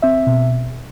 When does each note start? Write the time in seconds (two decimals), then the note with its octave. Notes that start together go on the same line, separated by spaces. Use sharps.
0.02 C4 E5
0.27 B2